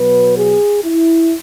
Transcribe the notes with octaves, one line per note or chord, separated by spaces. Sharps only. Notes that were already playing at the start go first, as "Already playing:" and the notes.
Already playing: B2 F#3 B3 B4
G#4
E4